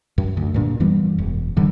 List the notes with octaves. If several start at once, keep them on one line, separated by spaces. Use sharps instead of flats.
F#2
D2
G2 A#2 D4
F#2 E3 G3 B3
E1
G2 D3 D#3 G3